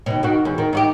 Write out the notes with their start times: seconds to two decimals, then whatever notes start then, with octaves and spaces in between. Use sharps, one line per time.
0.06 D#2 B2
0.23 D#3 F#4
0.45 E2
0.58 D#3
0.73 D#4 F#4 G4